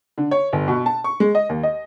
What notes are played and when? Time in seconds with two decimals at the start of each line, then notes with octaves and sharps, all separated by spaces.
0.18 D3
0.31 C#5
0.53 G1
0.68 B2
0.86 A5
1.04 C#6
1.20 G#3
1.35 D#5
1.49 D#2
1.63 D#5